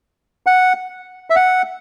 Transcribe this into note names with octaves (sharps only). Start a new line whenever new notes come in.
F#5
E5
F#5